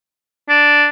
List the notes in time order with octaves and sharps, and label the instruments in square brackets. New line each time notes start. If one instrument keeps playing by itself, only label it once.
[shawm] D4